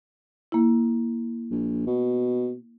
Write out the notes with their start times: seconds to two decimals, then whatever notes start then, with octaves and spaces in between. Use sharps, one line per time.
0.52 A#3 E4
1.51 A#1
1.87 B2